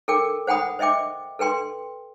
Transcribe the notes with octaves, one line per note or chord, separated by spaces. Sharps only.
A4 A#4 G5 D6
C5 F#5 G5 B5 D#6
C5 D#5 E5 G5 D6
A4 B4 G5 C6